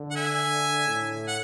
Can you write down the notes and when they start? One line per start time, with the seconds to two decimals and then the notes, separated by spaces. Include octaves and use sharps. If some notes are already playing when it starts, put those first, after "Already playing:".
Already playing: D3
0.11 F#5
0.16 E5 G#5
0.88 A2
1.28 F#5